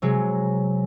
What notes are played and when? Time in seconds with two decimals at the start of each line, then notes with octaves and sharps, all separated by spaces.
0.02 C3 F#3 G#3